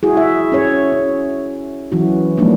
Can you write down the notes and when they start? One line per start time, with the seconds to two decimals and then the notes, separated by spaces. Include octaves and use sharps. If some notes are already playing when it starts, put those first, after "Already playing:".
0.03 E4 F#4 G#4
0.17 E4 E5
0.52 C#4 G#4 C#5
0.92 C#4
1.92 E3 F#3 C#4 E4 F#4
2.38 F3 G3 G#3 A#3 D4 D#4